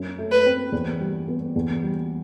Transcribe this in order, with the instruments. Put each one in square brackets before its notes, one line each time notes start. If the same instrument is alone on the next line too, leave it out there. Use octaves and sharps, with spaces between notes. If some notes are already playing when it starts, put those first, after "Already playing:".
Already playing: [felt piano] F#2
A3
[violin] B4
[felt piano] C4
E2
G3
B3
E2
G3